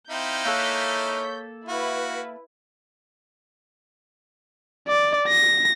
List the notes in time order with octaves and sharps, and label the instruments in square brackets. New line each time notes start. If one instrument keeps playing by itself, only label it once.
[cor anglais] C4 [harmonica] D#4 E4 F5 [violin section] G6 B6
[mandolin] A#3 A4 F#6 [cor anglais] C#5
[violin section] E4 B4 [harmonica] F#4 [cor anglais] F5
[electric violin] D5
A#6